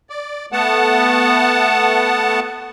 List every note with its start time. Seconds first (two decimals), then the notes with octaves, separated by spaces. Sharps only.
0.10 D5
0.52 A3 B3 F#5 A5